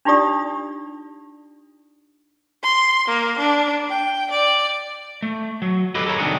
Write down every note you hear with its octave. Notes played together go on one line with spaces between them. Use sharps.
D4 D#4 F4 G4 D5 D#6
C6
A#3
D4
G5
D5
A3
F#3
G4 A4 B4 C#5 D#5
A4 A#4 C#5 A5 A#5
C3 D#3 G3 D4 F#4 G#4